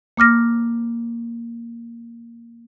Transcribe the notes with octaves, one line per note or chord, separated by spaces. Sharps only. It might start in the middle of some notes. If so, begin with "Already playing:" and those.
A#3 D6 F6 A#6